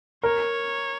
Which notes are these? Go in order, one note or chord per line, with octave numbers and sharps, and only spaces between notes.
A#4 C#5